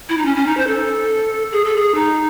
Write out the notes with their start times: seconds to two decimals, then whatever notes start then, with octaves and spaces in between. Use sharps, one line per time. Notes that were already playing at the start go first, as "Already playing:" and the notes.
0.09 E4
0.18 D#4
0.25 C#4
0.36 C#4
0.47 D#4
0.57 C5
0.67 A4
1.52 G#4
1.64 A4
1.76 G#4
1.95 D#4